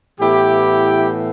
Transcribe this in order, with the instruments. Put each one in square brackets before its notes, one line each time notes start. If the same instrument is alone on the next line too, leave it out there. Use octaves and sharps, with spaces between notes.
[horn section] A2 E3 B3 E4 G4